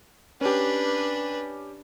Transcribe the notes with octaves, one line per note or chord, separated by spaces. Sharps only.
C#4 D4 G4 B4